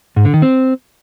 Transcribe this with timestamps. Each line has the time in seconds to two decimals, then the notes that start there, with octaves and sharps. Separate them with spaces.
0.16 G#2
0.25 D3
0.34 D#3
0.42 C4